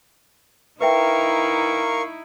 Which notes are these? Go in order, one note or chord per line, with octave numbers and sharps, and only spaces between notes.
D#4 E4 A#4 B4 E5 F5 G5 C#6